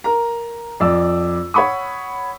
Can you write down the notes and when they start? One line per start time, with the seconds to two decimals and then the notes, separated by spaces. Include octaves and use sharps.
0.04 A#4 A#5
0.80 F2 D5 E6
1.54 C#5 F#5 B5 C#6 D#6